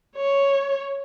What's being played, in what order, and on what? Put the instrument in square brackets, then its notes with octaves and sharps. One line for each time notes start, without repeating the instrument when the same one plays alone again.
[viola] C#5